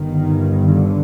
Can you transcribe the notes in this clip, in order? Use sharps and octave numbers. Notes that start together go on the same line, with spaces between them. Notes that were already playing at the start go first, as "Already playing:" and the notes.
Already playing: G1 G2 D#3
D3